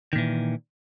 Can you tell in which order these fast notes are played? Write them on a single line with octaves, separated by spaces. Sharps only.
D#3 A#2 E3